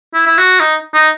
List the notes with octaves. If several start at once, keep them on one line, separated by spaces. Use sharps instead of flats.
E4
E4
F#4
D#4
D#4